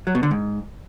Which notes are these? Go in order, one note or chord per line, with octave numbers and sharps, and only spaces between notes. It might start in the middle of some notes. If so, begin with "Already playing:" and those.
F#3
B2
D3
G#2